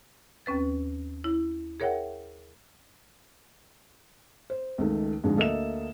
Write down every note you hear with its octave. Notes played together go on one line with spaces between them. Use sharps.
D#2 C4 C#4 B4 A6
E4
G#4 A#4 C#5 E5 F#5 G5
C5
C#2 D#3 A3
G#2 D3 F3 G#3
D2 A#3 A4 D#5 E5 E7